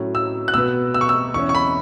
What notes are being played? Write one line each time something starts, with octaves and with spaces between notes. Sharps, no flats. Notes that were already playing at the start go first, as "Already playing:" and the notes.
Already playing: A2 F#3 C#4
E6
F#6
B2 B3 E6
E6
C#6
E6
E2 E3 C#4 C#6
C#6
B5